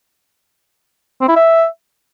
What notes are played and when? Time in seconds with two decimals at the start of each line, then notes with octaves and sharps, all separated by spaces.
1.21 C4
1.29 E4
1.36 E5